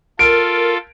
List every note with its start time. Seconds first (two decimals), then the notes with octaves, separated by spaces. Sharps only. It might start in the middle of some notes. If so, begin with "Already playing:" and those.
0.19 F4 A4 A#4 D7